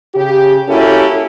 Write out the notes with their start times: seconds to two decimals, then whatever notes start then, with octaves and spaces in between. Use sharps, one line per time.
0.15 C#3 G4
0.68 A#3 C#4 E4 F#4 G4 A4